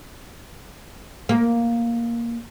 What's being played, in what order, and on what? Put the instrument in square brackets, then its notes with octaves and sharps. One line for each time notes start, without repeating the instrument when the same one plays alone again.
[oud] A#3